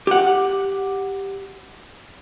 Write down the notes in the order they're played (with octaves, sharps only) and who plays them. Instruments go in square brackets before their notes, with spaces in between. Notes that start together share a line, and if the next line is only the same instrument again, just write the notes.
[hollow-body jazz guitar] G4 F#5